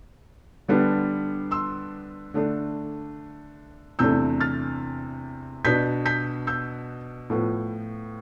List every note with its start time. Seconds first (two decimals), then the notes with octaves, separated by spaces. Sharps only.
0.68 D3 G3 B3 D4
1.51 C6 E6
2.34 D3 A3 D4
3.99 E2 C3 E3 A3 D4 E6 G6
4.40 F6 A6
5.65 B2 B3 D4 G6 B6
6.05 G6 B6
6.47 E6 G6
7.30 A2 F3 B3